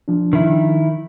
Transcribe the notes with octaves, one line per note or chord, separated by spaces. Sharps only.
F3 D4
D#3 E4